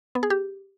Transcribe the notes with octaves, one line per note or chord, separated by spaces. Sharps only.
B3
G#4
G4